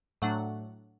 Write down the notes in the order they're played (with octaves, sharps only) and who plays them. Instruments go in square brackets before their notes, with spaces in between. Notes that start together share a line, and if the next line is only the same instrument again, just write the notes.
[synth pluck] A2 F#3 A3 D4 F#5